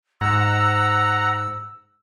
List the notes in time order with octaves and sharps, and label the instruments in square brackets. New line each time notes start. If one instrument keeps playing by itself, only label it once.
[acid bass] G#2 [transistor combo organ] F#5 A#5 [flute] E6